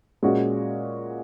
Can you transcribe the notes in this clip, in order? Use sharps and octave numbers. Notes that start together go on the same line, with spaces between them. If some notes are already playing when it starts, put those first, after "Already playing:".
A#2 G#3 C#4 F#4